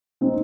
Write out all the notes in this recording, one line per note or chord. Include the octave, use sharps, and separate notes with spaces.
C4 D#4